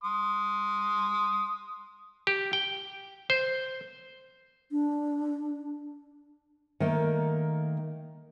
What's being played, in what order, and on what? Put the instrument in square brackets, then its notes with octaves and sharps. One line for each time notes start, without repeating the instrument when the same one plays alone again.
[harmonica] C6 D#6
[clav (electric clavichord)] G4
G5
C5
[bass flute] D4
[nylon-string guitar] D#3 A3 A#3 D#5